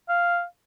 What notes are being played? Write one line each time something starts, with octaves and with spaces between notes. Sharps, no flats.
F5